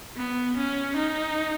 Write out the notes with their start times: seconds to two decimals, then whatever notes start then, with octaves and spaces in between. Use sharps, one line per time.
0.17 B3
0.57 C#4
0.96 D#4